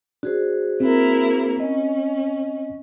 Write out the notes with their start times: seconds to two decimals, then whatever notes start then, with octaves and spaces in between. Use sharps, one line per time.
0.23 D4 F#4 G#4 C5
0.80 A#3 C4 E4 A#4
1.60 C#4 D#5